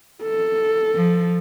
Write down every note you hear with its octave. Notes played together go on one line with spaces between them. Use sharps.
A4
F3